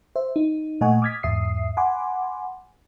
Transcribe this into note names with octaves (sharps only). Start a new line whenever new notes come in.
C5 E5
D#4
A#2 A3 D#5 F#5 G#5 C#6
D6 D#6 F6 G#6 A6 B6
E2 G#2 E5 D#6 C7
F#5 G#5 B5 C6 D6